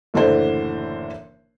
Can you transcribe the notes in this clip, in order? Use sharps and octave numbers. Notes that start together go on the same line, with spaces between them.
F#1 A2 D3 E3 D4 C5